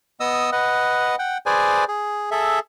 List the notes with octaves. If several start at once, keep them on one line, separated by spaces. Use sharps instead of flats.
B3 D#5 D#6 E6
B4 D#5 F#5
F#5 G5
G#4 B4 C5 D5 G#5
G#4
G#4 A4 E5